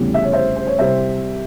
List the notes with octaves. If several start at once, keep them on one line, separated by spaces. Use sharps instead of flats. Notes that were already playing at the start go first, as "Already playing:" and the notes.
Already playing: F1 E2 C#3 G3
E5
C#5
C5 E5
C5
C#5
C2 C3 G3 C5 E5